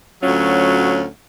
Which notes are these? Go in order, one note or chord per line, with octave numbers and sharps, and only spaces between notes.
D2 F#3 C#4 F4